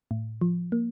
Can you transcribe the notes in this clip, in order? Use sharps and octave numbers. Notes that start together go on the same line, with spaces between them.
A2
F3
A#3